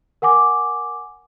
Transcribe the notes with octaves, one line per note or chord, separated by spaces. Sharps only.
A#4 F#5 G#5 D6